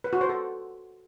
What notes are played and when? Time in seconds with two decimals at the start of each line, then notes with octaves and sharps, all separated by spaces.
0.04 B4
0.13 F#4
0.21 C5
0.29 A4